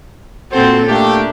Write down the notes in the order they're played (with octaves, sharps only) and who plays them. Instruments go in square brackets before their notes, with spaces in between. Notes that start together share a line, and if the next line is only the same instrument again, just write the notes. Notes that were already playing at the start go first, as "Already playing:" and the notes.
[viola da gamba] A#2 C4 A4 [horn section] F#4 C5
[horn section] A3 A#3 G4 [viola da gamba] D4